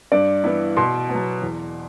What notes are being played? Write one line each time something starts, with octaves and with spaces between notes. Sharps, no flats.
G2 D5
E3 B3 E4
B2 C6
F#3 B3
E2